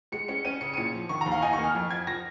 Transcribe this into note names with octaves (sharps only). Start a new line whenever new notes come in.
G#3 C#7
C#4 C#7
C#4 D#7
C#3 C#7
D#7
A#2 C#7
F3
D#3 C#6
A#5
D#2
F5
D#4 G#5
C#6
A#3
F6
F2
F3 G#6
F3 A#6